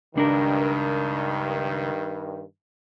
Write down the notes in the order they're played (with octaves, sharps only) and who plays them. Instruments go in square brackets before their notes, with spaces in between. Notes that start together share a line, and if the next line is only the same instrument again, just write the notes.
[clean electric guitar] C#2 D4 A#4 [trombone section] G2 D#3